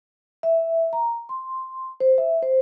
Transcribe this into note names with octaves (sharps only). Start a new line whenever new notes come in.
E5
A#5
C6
C5
E5
C5